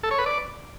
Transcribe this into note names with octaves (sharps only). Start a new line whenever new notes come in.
A4
C#5
B4
D5